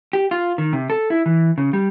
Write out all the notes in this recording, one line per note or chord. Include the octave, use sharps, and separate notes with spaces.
G4
F4
D#3
C3
A4
E4
E3
C#3
G3